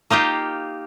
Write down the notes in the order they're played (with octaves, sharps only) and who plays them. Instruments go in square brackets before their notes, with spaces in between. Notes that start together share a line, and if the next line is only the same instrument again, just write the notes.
[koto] A#3 D#4 F4 G4